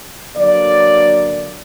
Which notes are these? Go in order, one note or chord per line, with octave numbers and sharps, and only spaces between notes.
D3 F#3 A#3 D5